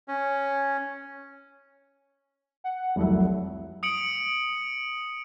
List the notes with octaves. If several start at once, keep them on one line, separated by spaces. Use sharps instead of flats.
C#4
F#5
F1 C2 F#3 E5
D#6 C#7 D7 F#7